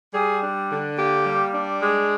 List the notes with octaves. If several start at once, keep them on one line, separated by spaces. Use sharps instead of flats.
G3 G#4
D4
D3
A#3 G4
G3
D4
G#3